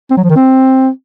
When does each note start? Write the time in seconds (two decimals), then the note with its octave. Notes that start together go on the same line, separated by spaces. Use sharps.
0.11 C4
0.17 F#3
0.23 F3
0.30 D#3
0.36 C4